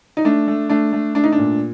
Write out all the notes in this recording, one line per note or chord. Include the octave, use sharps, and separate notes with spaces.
D#4
A3 D4
A3
A3 D4
A3
A3 D4
D#4
D4
A#2